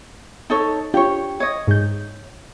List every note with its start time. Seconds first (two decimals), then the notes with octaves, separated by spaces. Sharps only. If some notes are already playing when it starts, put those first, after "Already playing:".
0.50 D#4 A4 C#5
0.94 D4 F4 G4 C#5
1.40 C#5 D#5
1.67 G#2 G6